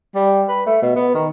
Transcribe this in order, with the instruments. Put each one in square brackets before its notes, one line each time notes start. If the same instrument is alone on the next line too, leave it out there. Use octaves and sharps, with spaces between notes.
[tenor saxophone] G3
B4
A3
B2
B3
D#3